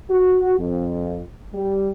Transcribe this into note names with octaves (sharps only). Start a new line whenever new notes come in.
F#4
F2
G3